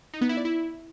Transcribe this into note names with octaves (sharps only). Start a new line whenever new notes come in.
D#4
B3
E4
D5
E4